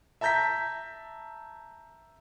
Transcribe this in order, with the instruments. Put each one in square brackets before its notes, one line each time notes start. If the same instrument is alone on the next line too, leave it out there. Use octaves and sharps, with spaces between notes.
[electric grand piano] E5 A5 A#5 G6 A#6 B6